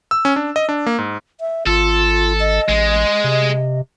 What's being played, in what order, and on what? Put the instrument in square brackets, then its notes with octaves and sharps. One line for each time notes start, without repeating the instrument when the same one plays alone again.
[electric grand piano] E6
C#4
D4
D#5
D4
A#3
G#2
[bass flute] E5
[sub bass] G#1 [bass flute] F4 [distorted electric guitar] A4
[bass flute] D#5
[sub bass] A1 [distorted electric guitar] G#3
[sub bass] C3